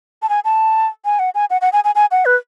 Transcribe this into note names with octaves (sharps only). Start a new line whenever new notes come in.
A5
G#5
A5
G#5
F#5
G#5
F#5
F#5
G#5
G#5
G#5
F#5
B4